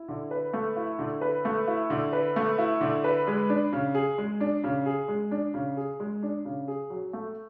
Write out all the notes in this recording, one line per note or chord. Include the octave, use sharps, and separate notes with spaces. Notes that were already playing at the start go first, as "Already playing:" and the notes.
Already playing: E4
D3
B4
A3
E4
D3
B4
A3
E4
D3
B4
A3
E4
D3
B4
G#3
D4
C#3
G#4
G#3
D4
C#3
G#4
G#3
D4
C#3
G#4
G#3
D4
C#3
G#4
F#3
A3